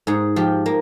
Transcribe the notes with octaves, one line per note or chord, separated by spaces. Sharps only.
G#2 G#4
F3 G4
A#3